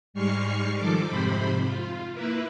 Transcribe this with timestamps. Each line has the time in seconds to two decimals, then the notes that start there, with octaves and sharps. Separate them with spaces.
0.14 G#2 G3 G#3 C#6 F6 C7
0.77 D#3 F3 A4 D6
1.07 F2 G#2 C3 C5 B5
1.64 F4
2.13 A#3 E4 B4